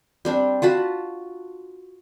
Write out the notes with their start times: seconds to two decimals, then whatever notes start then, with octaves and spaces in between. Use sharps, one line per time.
0.25 G3 C4 D4
0.62 F4 F#4 A5 B5